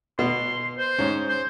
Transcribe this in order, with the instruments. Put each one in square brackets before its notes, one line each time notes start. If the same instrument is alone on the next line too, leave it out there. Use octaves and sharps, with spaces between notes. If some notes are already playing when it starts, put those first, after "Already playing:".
[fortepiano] B2 [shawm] C6
[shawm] C5
[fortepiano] G#2 C#4
[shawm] C5